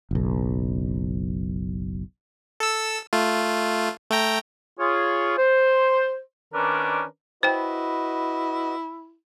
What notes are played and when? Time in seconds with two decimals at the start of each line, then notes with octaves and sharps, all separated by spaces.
0.11 F#1 B1
2.60 A4 E6
3.13 A3 F4
4.11 A3 G5 A#5
4.80 F4 G#4 C#5
5.38 C5
6.54 D#3 C#4 D4 A#4 B4 D5
7.43 E4 F#4 B4 C5 D#5 G5